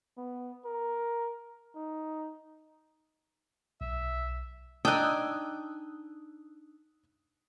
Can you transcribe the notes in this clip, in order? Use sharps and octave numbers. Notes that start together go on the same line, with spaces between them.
B3
A#4
D#4
B1 E5
D4 D#4 G5 G#5 D#6 E6 F#6